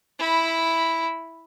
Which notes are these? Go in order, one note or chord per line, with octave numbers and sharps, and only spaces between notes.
E4 B5